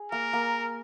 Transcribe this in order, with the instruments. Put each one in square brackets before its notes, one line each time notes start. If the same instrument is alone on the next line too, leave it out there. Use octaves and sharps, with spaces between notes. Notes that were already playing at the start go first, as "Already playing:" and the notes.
Already playing: [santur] G#4
[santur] A#3 [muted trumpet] A#4
[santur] A#3